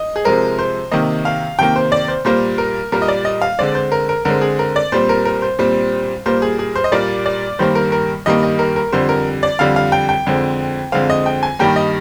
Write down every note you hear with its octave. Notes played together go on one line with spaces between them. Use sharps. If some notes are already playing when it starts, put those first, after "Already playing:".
Already playing: D#5
G#4
C3 F3 G#3 C4 A#4
C5
C3 D#3 A#3 D#5
F5
C3 D#3 A#3 G5
C5
D5
C5
A#2 G3 A#3 C5
A#4
A#2 G3 A#3 A#4
D#5
D5
D#5
F5
D3 G#3 C4 D5
C5
A#4
A#4
D3 G#3 C4 A#4
G#4
A#4
D5
A#2 G3 C4 C5
A#4
A#4
C5
A#2 G3 C4
A#2 G3 A#3 C5
G#4
G#4
C5
D#5
A#2 G3 A#3 D5
D5
G2 D#3 G3 A#3 C5
A#4
A#4
G2 D#3 G3 A#3 D#5
D#5
A#4
A#4
F2 D3 G3 C5
A#4
D5
F2 D3 G3 F5
F5
G5
G5
F2 D3 G#3 C4
F2 D3 G#3 C4 F5
D#5
G5
G#5
G2 D#3 G3 A#3 G5
D#5